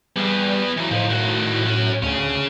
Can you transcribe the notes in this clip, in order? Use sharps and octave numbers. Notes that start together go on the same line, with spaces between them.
G3 B3 G#4
E3 F#3
A2 F3 D#4
D#3 F#4
C#4 F#4
D2 C#4 G#4